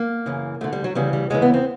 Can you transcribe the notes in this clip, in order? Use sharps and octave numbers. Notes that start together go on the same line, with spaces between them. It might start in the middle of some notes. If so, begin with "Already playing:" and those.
Already playing: A#3
F#2 C#3 E3
D2 D3 A3
G3
F#3
D2 C#3 E3 G3
G3
D#2 C#3 E3 G#3
B3
C4